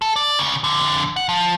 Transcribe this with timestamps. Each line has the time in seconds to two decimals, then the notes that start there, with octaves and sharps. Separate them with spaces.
0.02 A4
0.16 D5
0.39 D2 C#3
0.64 F2 D3
1.16 F#5
1.29 F3